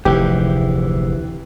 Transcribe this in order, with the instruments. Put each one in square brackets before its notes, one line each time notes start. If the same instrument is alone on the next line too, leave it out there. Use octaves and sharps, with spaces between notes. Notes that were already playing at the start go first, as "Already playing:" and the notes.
[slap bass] F1 G#2 [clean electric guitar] D2 E3 [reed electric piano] G4